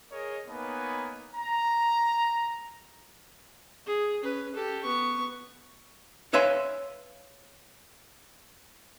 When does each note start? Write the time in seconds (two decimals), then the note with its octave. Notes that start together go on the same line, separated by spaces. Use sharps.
0.12 G#4 A#4 C#5 D#5
0.48 A#3 B3 D#4 B4 C#5 G#5
1.36 A#5
3.86 G#4
4.22 C#4 B4
4.55 G4 A4
4.84 B3 C#6
6.33 B4 C#5 E5 F5 G#5 C6